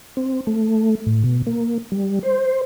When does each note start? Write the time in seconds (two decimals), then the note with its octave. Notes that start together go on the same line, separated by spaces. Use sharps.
0.17 C4
0.47 A3
1.06 A2
1.24 B2
1.47 A#3
1.92 G3
2.23 C5